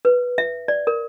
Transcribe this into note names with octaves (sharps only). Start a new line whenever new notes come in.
B4
E5
D5
A#4